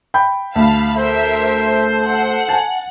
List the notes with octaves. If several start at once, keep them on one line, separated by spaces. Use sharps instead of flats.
G5 B5 G6
D2 F5 A5 B5
A4 A#4 C5 E5
F#5 F#6
G#5 A5